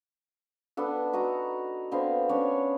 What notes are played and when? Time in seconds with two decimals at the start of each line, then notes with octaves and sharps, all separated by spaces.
0.77 B3 D4 A4
1.13 D#4 F#4 D#5 A#5
1.91 D3 B3 C4 F5
2.29 C#4 D4 C#5